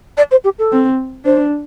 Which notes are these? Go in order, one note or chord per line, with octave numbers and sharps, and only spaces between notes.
D5
C5
G4
A4
C4
D4 C5